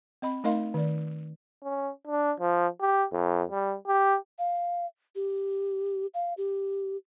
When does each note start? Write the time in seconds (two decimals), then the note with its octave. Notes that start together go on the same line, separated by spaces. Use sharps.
0.22 C4 D#5 B5
0.44 A3 D#4 A#4 D#5 F5 C6
0.74 D#3 D5
1.63 C#4
2.07 D4
2.40 F3
2.81 G4
3.12 F2
3.51 G3
3.87 G4
4.39 F5
5.16 G4
6.14 F5
6.37 G4